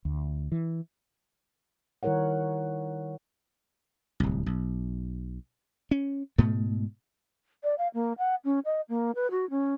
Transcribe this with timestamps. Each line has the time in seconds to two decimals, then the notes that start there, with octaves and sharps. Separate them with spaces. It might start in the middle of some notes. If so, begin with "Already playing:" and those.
0.05 D2
0.52 E3
2.03 D#3 G3 E4 A#4 C#5 F#5
4.20 D1 C2
4.46 B1
5.91 C#4
6.38 G#2 B2 A3
7.64 D5
7.78 F5
7.94 A#3
8.18 F#5
8.45 C#4
8.65 D#5
8.89 A#3
9.15 B4
9.31 F#4
9.50 C#4